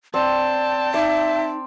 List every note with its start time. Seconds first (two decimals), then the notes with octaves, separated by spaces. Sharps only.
0.14 C4 D5 G5 A5
0.94 D#4 D5 E5